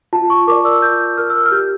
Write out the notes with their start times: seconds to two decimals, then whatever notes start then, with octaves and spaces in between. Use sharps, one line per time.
0.13 F4 A5
0.30 C#6
0.48 A#4 D6
0.51 D5
0.65 E6
0.82 F4 G6
1.00 G6
1.17 A#4 D5 F6
1.30 E6
1.35 F6
1.46 F6
1.51 G4 G6